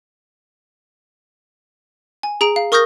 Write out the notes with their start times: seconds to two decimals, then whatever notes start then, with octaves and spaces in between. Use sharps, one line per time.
2.23 G#5
2.41 G#4 A#5 D7
2.56 F5
2.72 A#4 C#6 D#6 F6 G6 A#6